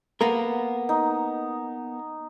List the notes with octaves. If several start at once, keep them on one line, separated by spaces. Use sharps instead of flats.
A#3 B3 A#4
D#4